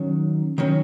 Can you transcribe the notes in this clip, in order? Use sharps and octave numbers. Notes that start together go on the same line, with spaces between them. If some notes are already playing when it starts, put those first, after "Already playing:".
Already playing: D#3 F#3 C#4
D#3 F#3 C#4